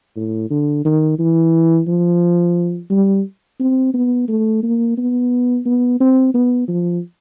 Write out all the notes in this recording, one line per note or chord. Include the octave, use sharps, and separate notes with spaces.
A2
D3
D#3
E3
F3
G3
C4
B3
A3
A#3
B3
B3
C4
B3
F3